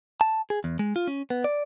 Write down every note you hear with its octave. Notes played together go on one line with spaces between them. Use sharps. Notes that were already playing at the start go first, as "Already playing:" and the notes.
A5
G#4
E2
G#3
F4
C#4
B3
D5